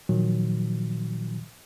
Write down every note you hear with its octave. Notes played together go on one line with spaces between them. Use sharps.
A#2 D#3 F3 F#3